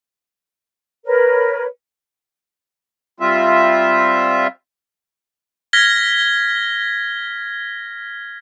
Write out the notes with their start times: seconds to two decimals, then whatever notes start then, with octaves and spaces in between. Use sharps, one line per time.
1.05 A#4 B4 C#5
3.20 G3 C4 F4 E5
5.73 F6 G#6 A#6 B6 G7